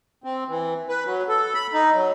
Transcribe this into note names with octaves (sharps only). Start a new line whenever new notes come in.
C4
E3
B4
F#3
A4
B5
D#4
F#3